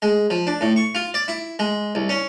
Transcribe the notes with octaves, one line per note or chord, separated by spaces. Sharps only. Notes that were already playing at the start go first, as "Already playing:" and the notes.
G#3
F3
D4
A2
C#6
F4
D5
E4
G#3
C2
C#4